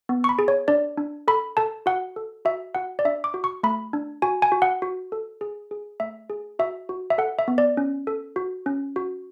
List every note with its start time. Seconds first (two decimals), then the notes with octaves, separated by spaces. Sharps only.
0.09 B3
0.24 C#6
0.29 B5
0.39 G#4
0.48 C#5
0.68 D4 D5
0.98 D4
1.28 A4 B5
1.57 A4 A5
1.86 F#4 F#5
2.16 A4
2.45 F#4 E5
2.75 F#4 F#5
2.99 D5
3.05 D4 E5
3.24 D6
3.34 F#4
3.44 C#6
3.63 A3 B5
3.93 D4
4.22 F#4 G#5
4.42 G#5
4.52 F#4
4.62 F#5
4.82 F#4
5.12 A4
5.41 G#4
5.71 G#4
6.00 A3 E5
6.30 G#4
6.59 F#4 E5
6.89 F#4
7.10 E5
7.18 A4 F#5
7.39 E5
7.48 B3
7.58 D5
7.77 C#4
8.07 A4
8.36 F#4
8.66 C#4
8.96 F#4